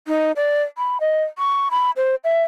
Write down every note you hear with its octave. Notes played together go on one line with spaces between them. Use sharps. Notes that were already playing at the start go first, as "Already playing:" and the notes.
D#4
D5
B5
D#5
C#6
B5
C5
E5